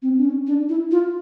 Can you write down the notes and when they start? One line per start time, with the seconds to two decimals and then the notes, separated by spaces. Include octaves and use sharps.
0.02 C4
0.17 D4
0.25 C#4
0.47 D4
0.69 E4
0.91 F4